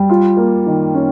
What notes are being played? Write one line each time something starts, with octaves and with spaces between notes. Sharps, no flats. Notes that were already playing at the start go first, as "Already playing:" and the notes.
Already playing: G3
F4
A#3
D#3
C#4